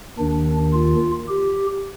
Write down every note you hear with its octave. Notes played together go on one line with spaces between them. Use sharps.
D#2 D#3 D4
F4
G4